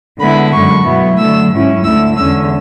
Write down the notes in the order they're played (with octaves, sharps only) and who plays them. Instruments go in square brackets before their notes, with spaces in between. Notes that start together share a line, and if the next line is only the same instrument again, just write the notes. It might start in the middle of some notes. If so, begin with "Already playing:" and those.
[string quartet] D3 G#3 B3 E4 B5
F#2 D3 G#3 C#6
B2 F#3 B3 E4
D3 F#3 A3 E6
G#2 F#3 C#4 E4
D2 D3 A3 E4 E6
E2 D3 G#3 C#4 E6